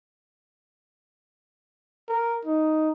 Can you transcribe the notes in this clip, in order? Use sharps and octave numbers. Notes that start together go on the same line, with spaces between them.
A#4
D#4